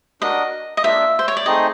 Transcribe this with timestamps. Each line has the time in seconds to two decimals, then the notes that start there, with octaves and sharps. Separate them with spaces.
0.21 D4 F#4 A#4 D#5
0.77 D#5
0.83 A#3 D4 F4 E5
1.19 C5
1.28 C#5
1.37 D5
1.46 A3 C4 D#4 G#4 D#5